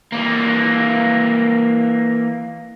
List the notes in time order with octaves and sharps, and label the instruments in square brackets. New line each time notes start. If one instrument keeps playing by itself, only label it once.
[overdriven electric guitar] E3 A#3